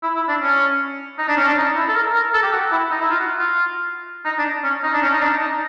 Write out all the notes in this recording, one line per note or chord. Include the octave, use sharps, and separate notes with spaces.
E4
E4
D4
C#4
D#4
D4
C#4
D4
D#4
E4
A4
A#4
A#4
A4
G4
F#4
E4
D#4
E4
F4
F#4
F4
D#4
D4
C#4
D#4
D4
C#4
D#4
D4
D#4